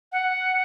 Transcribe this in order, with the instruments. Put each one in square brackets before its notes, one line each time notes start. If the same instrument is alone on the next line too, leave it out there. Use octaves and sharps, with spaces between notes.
[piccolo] F#5